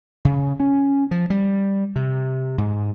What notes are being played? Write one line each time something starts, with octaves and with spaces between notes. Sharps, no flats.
C#3
C#4
F3
G3
C3
G#2